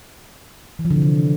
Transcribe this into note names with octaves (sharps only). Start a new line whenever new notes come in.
E3
F3
D3
C3
D3